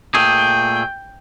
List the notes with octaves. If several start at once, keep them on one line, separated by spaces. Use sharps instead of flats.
A#2 A3 G#4 G5